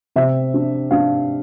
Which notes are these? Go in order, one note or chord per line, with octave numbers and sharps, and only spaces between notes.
C3 E5
D4
D4 F5